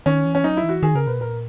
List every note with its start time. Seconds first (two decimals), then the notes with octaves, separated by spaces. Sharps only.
0.06 D#3 C#4
0.25 E3
0.35 C#4
0.44 F#3 D#4
0.57 E4
0.64 E3
0.69 F#4
0.83 D#3 G#4
0.95 C#3 A#4
1.07 B2 B4
1.20 A#2 A#4